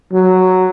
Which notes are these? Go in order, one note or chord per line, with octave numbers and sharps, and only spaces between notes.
F#3